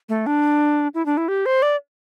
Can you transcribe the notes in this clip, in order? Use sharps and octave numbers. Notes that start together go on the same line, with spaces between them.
A3
D4
E4
D4
E4
G4
C5
D5